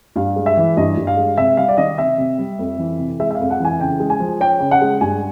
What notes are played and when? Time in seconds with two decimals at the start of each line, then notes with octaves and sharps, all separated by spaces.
0.16 G2 F5
0.36 G#3
0.46 E5
0.57 E3
0.77 G2 D#5
0.97 G2
1.07 F5
1.17 G#3
1.38 C3 E5
1.57 G3 F5
1.68 D5
1.77 D#3 D#5
1.98 C3 E5
2.18 C3
2.38 G3
2.59 F2
2.78 E3
2.99 C3
3.20 G#3 E5
3.31 E5
3.35 F2 F5
3.50 F#5
3.60 E3 G#5
3.80 C#3 G5
4.00 G#3
4.10 G#5
4.20 F3
4.40 C#4 G5
4.60 C#3
4.71 F#5
4.82 G#3
5.01 G2 G#5